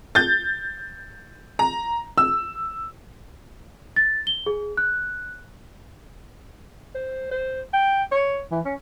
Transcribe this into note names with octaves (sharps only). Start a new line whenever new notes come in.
G6 A6
A#5
E6
A6
G7
G#4
F#6
C5
C5
G5
C#5
E3
C#4